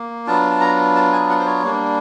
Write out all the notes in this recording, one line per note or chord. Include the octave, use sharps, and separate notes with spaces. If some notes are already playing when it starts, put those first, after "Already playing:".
Already playing: A#3
F#3 B3 D4 F4 A5
A5
A#5
A5
G#5
F#5
C5
C#5
G3 A#3 D4